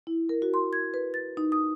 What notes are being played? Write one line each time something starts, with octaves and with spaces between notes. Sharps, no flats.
E4
A#4
F#4
C6
G#6
B4
A6
D#4
D#6